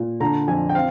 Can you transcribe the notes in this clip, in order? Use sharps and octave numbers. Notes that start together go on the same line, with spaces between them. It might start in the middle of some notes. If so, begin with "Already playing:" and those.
Already playing: A#2
D3 A#5
F2 G#5
G5
C4 F5